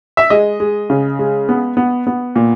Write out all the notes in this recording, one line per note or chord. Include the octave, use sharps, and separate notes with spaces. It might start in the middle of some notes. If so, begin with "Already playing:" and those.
E5
G#3 D#5
G#3
C#3
G#3
B3
B3
B3
A#2